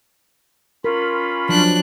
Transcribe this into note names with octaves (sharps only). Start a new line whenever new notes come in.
C#4 F4 A#4 B5
F3 F#3 D4 F#6